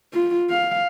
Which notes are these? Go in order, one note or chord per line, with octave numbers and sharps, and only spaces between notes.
F4
F5